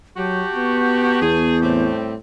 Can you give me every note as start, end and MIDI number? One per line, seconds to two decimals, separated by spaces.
0.17 0.45 54
0.17 1.21 66
0.17 1.21 67
0.17 1.96 81
0.17 1.96 85
0.17 1.96 91
0.55 1.41 59
1.22 1.88 40
1.22 1.57 68
1.62 2.16 45
1.62 2.13 55
1.62 2.13 60